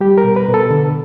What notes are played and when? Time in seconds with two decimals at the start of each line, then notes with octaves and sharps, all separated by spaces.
0.01 G3 G4
0.18 A#4
0.24 B2
0.36 B4
0.48 B2
0.54 A4
0.71 D3